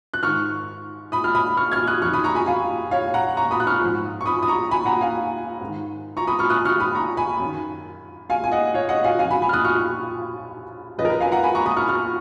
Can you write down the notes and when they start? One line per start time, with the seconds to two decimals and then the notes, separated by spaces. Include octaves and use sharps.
0.14 F#6
0.23 G#2 D#3 C#6 F6
1.12 B5 D#6
1.24 F6
1.35 B5 D#6
1.57 C#6 F6
1.72 F6 G#6
1.87 D#6 F#6
2.01 F2 C#6 F6
2.05 D#3
2.13 B5 D#6
2.24 A#5 C#6
2.35 G#5 B5
2.46 F5 G#5
2.91 C#5 F5
3.14 F#5 A#5
3.37 A#5 C#6
3.51 B5 D#6
3.60 F#6
3.67 C#6 F6
3.81 G#2 F3
4.21 C#6
4.26 B5 D#6
4.43 D#6
4.48 A#5 C#6
4.71 G#5 B5
4.86 F#5 A#5
5.01 F5 G#5
5.61 G#2 D#3
6.17 A#5 C#6
6.27 B5 D#6
6.39 C#6 F6
6.50 D#6 F#6
6.65 C#6 F6
6.80 B5 D#6
6.95 A#5 C#6
7.17 G#5 B5
7.39 F#2 D#3
8.30 F5 G#5
8.44 G#5
8.51 D#5 F#5
8.74 C#5 F5
8.89 D#5 F#5
9.04 F5 G#5
9.19 F#2 C#3 F3 F5 G#5
9.31 G#5 B5
9.42 G#5 B5
9.49 F6
9.53 D#6 F#6
9.64 C#6 F6
10.98 F#2 F3 B4 D#5
11.05 A#4
11.10 B4
11.20 F5 G#5
11.32 F#5 A#5
11.43 G#5 B5
11.55 A#5 C#6
11.65 B5 D#6
11.77 C#6 F6
11.88 C#6 F6